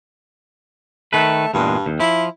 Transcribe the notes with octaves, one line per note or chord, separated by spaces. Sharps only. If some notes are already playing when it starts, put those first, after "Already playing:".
D#3 A3 B4
E2 G2 A#2 G#3
D#2
F3 E4